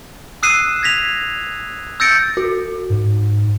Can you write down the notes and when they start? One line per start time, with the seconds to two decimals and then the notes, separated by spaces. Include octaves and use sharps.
0.43 D#6 E6 F#6 C7 D#7 E7
0.83 G#6 A#6 B6 F7
2.00 E6 G6 A6 A#6 C#7 D7
2.37 F#4
2.90 G#2